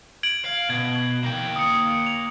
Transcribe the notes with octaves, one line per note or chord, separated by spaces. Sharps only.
G#6 D7 F#7
F5
B2 G#6
A#3 G5
D#6 C#7
F7